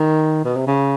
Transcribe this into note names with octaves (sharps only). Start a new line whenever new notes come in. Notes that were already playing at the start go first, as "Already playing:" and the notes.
Already playing: D#3
B2
C3
C#3